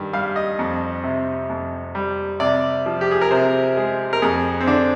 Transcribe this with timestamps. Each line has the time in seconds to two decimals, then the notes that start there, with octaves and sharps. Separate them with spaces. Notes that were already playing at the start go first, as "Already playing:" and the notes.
Already playing: G2 D#3
0.13 G3 F5
0.36 D#5
0.59 F2
1.03 C3
1.49 F2
1.95 G3
2.40 C3 D5
2.86 F3
3.01 G4
3.11 G#4
3.21 A#4
3.31 C3 C5
3.77 G#3
4.13 A#4
4.22 F2 G#4
4.60 C4
4.67 D3 D4